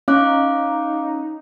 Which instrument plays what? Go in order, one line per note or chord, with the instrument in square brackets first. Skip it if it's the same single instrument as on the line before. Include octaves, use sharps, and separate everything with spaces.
[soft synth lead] C#4 [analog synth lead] D#4 [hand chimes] F5 D6 F#6